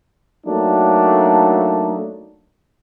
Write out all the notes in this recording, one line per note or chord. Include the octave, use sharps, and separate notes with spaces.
F#3 A3 A#3 D4 D#4